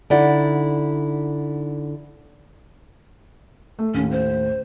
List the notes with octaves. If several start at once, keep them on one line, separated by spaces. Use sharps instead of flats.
D3 D#4 E4 D5 F#5
A3
D#2 A2 C#4
C5